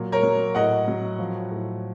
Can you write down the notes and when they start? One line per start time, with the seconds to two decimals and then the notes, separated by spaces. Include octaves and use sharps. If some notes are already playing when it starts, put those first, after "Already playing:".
Already playing: A#2 F#3
0.12 A#4 C#5
0.23 F#3
0.55 A2 D#5 F#5
0.88 F#3
1.19 F3
1.51 A2